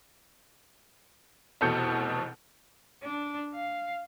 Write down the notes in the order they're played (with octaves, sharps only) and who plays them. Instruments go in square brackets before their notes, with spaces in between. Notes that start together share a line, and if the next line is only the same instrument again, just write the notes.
[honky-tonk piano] F1 E2 B2 A4 G6 C#7
[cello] D4
F5